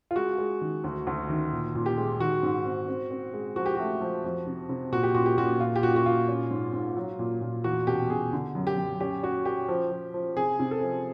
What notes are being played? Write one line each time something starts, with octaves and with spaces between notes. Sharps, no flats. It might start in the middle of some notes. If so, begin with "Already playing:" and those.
F4
G#3 F#4
G#3
D#3
D2
D2
D#3
A#2
A#2
G4
G#3
D#3 F#4
G#2
C4
C4
C4
G#3
F3 F#4
G4
A3 F#4
F3
F2
C3
C3
A#2 F#4
G4
A#2 F#4
G4
A#2 F#4
A#2 F4
G4
A#2 F#4
F#4
A#2 F4
C#4
G#2
G#2
F#3
A#2
A#2
E2 F#4
B2 G4
B2 G#4
D3
F#2
G4
F#2
C#4 G4
C#4 F#4
C#4 G4
F3
F3
F3
C3 G#4
C3
A4
F3